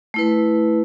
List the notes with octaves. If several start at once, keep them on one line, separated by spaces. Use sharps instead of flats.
A3 E4 B4